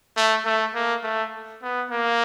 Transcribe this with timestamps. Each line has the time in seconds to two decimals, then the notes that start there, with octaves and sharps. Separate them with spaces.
0.17 A3
0.45 A3
0.74 A#3
1.03 A3
1.63 B3
1.91 A#3